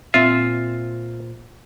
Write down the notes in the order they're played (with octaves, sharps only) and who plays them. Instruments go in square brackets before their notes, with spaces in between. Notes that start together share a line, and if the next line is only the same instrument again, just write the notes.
[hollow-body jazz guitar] A#2 C4 E5 [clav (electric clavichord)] F4